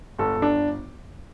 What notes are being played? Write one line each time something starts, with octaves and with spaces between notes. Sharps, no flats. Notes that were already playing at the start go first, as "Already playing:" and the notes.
G1 A4
G1
D4